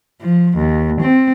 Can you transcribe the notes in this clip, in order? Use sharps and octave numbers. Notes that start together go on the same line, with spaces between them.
F3
D#2
C4